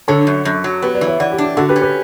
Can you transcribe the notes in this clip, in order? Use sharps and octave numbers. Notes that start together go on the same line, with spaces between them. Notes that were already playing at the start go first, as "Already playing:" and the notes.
D3 A4 C#5
F#2
F#2
F#3
B3 G4 B4
B4 D5
E3
C#5 E5
E3 D5 F#5
G4
D4
G4
D3 F#4 A4
G4 B4
C#4
G4 B4